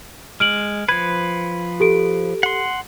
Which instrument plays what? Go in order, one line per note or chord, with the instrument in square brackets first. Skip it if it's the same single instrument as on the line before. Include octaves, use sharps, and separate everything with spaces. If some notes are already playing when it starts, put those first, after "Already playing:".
[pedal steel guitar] G#3 [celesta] F6 D7 F#7
[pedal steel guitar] F3 B4 [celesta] G#6
[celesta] G4 A4 D7
[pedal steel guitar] F#5 C6